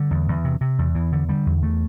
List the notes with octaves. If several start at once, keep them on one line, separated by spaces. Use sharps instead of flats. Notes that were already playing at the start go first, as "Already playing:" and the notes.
Already playing: D3 G3
E2
E2
C3
C3
E2
E2 E3
D3
D3 G3
E2
E2 A3